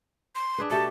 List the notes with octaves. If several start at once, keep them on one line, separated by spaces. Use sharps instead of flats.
C6
D4 G#4 B4
B2 A3 G4 A5